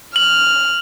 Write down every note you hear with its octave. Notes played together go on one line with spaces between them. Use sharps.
F6 F#7